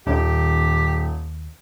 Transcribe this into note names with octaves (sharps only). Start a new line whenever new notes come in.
D#1 D#2 G4